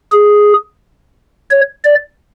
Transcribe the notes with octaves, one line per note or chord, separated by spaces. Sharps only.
G#4
C#5
D5